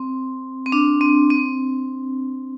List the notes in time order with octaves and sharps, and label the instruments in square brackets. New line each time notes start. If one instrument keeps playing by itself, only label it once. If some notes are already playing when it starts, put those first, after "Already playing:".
Already playing: [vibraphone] C4
C4
D4
C4
C4